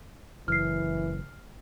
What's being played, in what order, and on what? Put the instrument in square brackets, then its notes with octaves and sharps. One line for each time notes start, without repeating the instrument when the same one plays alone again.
[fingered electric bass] F#1 [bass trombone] E3 [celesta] F6 C7